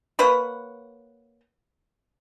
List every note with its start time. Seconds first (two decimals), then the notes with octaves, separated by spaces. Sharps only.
0.19 A#3 B4 C#5 F#5